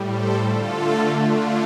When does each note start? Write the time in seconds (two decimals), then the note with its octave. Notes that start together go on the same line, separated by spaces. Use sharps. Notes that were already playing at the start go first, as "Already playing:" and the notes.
Already playing: A2 G3
0.09 A4 C5
0.45 D3 A3 F4 A4
1.20 D4 F4